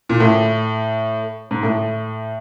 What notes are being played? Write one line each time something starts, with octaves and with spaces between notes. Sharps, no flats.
A#2
A2
G#2
A2